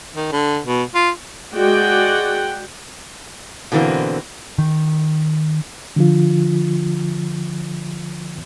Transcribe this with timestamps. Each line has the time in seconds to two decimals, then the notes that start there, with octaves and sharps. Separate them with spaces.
0.16 D#3
0.32 D3
0.65 B2
0.95 F4
1.55 G#3 F#4 D5 F#5 G5
3.72 B2 D3 E3 A#3 C4
4.59 D#3
5.96 D3 F3 F4